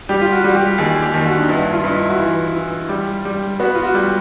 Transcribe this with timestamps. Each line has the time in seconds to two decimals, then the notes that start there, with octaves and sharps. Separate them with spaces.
0.09 G3 G4
0.21 F4
0.32 F#4
0.44 G3 F#4
0.56 G4
0.78 D#2 G#4
1.02 G4
1.14 D#2
1.26 F#4
1.35 D4
1.42 D#4
1.49 G2 E4
1.72 F4
1.84 G2 D#4
1.96 E4
2.09 F#4
2.19 E3 F4
2.55 E3
2.89 G3
3.25 G3
3.59 B3 F#4
3.75 F4
3.83 F#4
3.94 G3